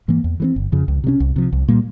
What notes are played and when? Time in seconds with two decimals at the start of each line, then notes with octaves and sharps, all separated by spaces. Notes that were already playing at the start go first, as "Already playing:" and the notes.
0.08 G#2 E3 A#3
0.24 E2
0.40 E3 G#3 C4
0.56 G1
0.72 F2 C#3 F3
0.88 C#2
1.04 C3 G3 C#4
1.20 C2
1.36 C3 F3
1.52 C2
1.68 A#2 G3 A#3